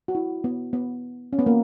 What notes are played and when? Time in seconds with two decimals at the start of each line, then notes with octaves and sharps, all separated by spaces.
0.08 F#4
0.15 E4
0.44 B3
0.73 B3
1.33 C#4
1.39 B3
1.46 A#3